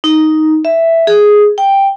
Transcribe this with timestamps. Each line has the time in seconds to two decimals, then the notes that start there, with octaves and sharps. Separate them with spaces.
0.04 D#4
0.65 E5
1.07 G#4
1.58 G5